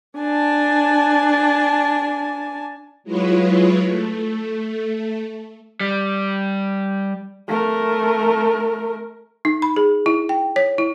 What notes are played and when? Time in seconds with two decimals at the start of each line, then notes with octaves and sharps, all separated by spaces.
0.18 D4 G#5 A5
3.04 F#3 G#3 E4 F4 B4 C#5
3.85 A3
5.80 G3
7.48 A3 A#4
9.45 D#4
9.62 B5
9.76 G#4
10.06 E4
10.29 G5
10.56 C#5
10.78 E4